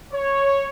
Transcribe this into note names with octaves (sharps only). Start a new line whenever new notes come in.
C#5